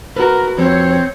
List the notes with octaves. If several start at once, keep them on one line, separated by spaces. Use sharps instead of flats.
F#4 A#4 B4
F2 C4 C#5